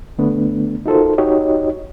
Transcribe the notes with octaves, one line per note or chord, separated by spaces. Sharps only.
D3 A3 B3 D4
D#4 F4 F#4 A4 A#4 C5
D#4 F#4 G4 C#5 D#5